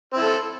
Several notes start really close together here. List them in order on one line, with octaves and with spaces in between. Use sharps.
C4 E4 A4